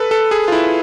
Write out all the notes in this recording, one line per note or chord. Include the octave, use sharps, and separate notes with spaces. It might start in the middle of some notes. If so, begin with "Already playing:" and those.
Already playing: A4 B4
A4
G#4
F4
E4